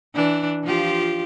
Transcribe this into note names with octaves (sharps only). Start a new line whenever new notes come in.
E3 D4
F3 F4 G4